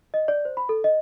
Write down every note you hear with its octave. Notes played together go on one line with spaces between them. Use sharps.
D#5
D5
C5
B5
A4
D#5